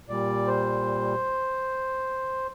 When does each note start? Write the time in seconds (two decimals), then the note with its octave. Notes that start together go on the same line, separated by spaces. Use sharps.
0.08 A#2 G3 D5
0.47 C5